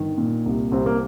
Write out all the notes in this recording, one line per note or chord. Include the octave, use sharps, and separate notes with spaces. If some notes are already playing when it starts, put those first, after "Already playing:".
Already playing: G1 D#3
A#2
C2
C2 C4
A#3